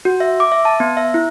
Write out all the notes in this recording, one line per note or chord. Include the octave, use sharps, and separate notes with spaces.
F#4
E5
D6
E5
A5
B3
E5
E4